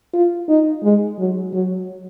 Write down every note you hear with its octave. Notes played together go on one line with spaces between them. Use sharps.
F4
D#4
G#3
F#3
F#3